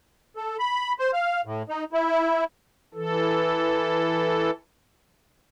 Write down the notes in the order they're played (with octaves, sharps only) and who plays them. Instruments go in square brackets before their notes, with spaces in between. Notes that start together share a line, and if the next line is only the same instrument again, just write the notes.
[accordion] A4
B5
C5
F5
A2
D#4
E4
[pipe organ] E3 A4